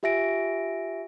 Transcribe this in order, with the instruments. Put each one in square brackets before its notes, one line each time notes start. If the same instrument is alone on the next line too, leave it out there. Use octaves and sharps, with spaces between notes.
[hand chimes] F4 G4 E5 G#5 A#6 D7